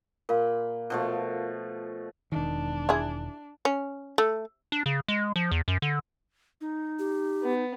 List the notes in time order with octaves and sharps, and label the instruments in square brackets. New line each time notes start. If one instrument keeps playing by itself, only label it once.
[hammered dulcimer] A#2 B5 [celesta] A#4 F5
[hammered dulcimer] B2 F3 A3
[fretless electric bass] E1 D#3 [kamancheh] D4
[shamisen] E4 G#4
C#4
A3
[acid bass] D4
C#3
G#3
F3
E2
F#2
D3
[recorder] D#4
[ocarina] G4
[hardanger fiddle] B3